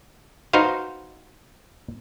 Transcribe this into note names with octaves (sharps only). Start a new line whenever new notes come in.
D#4 F#4 B4 C5 F5